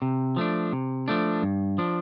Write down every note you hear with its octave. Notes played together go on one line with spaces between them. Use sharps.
C3
F3 A3 D4
C3
F3 A3 D4
G2
F3 D4